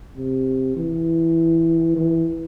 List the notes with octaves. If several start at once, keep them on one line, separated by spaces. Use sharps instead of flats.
C3
E3
E3